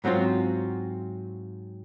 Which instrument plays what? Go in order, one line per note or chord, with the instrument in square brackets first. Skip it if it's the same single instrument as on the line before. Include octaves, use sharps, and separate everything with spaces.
[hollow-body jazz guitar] G#2 F#3 C4 C#4 F4